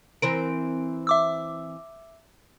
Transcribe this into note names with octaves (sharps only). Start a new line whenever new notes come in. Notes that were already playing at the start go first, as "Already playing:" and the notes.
E3 C4 A#4 D7
E5 D6 E6